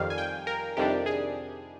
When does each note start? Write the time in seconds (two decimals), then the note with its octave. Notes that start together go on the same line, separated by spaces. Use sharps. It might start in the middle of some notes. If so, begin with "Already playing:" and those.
Already playing: F2 D#3 G3 F5
0.10 G#5
0.18 G5
0.47 A#4
0.77 F2 C3 D#3 G3 D4 G4
1.06 G#4